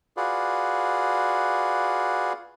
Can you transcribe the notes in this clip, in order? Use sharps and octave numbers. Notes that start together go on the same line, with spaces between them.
F4 F#4 G#4 B4 D5